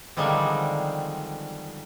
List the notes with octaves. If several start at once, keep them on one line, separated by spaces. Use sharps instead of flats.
D3 D#3 F3 G3 G#3 C4